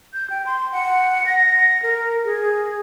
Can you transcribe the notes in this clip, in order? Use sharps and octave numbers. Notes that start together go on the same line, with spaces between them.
G6
G5
C6
F#5
A#6
A#4
G#4